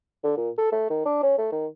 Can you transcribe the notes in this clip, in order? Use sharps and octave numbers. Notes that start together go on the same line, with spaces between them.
D3
A#2
A4
A3
D#3
D4
C#4
A3
D#3